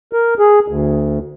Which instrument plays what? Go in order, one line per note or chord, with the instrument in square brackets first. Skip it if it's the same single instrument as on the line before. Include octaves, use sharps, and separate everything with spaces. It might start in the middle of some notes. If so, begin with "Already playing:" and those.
[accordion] A#4
G#4
D2